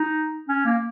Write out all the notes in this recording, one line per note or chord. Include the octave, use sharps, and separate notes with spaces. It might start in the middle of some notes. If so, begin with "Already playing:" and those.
Already playing: D#4
C#4
A#3